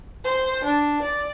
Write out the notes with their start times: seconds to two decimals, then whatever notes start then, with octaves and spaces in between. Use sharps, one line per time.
0.24 C5
0.64 D4
1.02 D5